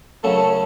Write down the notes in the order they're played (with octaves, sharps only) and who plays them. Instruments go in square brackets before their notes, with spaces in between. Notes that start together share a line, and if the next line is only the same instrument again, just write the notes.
[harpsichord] F#2 C#3 F#3 A3 [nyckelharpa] A4